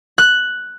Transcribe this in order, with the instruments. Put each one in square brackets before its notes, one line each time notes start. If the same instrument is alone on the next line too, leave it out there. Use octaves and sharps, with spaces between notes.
[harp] F#6